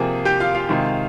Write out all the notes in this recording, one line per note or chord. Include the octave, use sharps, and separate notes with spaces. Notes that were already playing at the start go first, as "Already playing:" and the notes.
Already playing: C3 F3 A#3 G#4
G4 G5
F4 F5
F4 F5
C3 D#3 G#3